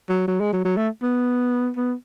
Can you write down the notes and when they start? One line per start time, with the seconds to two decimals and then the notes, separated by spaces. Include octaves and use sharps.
0.09 F#3
0.28 F#3
0.40 G#3
0.53 F#3
0.65 F#3
0.77 A3
1.02 B3
1.77 B3